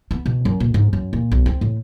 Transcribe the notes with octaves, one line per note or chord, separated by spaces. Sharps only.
B3
B2
F#2
A#2
G#2
F#2
A#2
B1
C4
A2